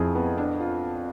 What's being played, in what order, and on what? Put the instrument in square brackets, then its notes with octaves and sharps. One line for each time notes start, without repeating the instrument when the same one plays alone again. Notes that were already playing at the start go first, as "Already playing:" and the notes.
Already playing: [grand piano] F2 F3 [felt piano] E4 G#4
[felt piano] B3
D4
F4